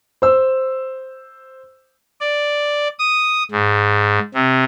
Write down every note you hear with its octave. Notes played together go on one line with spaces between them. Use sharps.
C5 E6
D5
D#6
G#2
C3